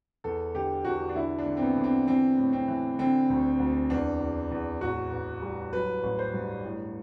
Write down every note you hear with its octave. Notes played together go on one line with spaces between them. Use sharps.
E2 A4
D3 G4
E2 F#4
D4
D3 E4
D4
D3
C4
B3
D3
C4
E3 C4
A2
C4
E3
D3 C4
D2
D2
E2 D4
E2
E2
A1 F#4
A1
G3
F#3 B4
A1
C5
G2
A2